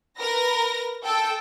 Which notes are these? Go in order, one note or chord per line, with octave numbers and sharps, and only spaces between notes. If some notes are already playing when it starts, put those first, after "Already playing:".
A#4 B4 A#6
A4 G5